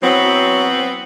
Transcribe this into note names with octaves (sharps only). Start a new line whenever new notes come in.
E3 F#3 B3 C4